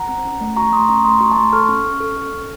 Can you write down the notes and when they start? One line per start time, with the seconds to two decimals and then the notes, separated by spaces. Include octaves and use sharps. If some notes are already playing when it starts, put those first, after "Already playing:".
Already playing: F#5 A#5
0.09 C4
0.25 C#4
0.41 A3
0.56 F#4 A#5 C#6
0.73 A3 C6 D#6
0.88 C#4 A#5 C#6
1.04 A3 C6 D#6
1.20 F#4 A#5 C#6
1.32 A5 C6
1.37 A3
1.52 A4 C#6 F6
1.69 C#4
1.85 C#4
2.00 A4
2.17 A4
2.33 C#4